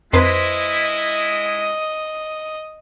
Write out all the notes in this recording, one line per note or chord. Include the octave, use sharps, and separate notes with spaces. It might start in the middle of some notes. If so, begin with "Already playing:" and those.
F2 G#3 E4 B4 C5 D#5